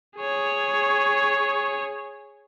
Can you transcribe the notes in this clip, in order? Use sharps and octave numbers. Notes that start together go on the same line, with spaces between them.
G#4 C#5